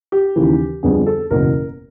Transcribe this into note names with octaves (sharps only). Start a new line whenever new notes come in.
G4
D#2 C#3 E3
F2 D3 G3 B3 D4 G#4
A4
F#1 E2 B2 A#4